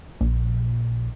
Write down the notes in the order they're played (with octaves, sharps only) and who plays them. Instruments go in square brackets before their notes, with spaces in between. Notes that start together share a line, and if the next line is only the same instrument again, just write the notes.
[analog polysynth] A#1